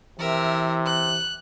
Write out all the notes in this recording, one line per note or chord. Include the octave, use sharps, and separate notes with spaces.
C3 E3 A#4 E5
F#6